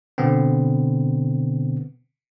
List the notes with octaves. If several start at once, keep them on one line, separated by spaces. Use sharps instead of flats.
B2 D3 B3 C4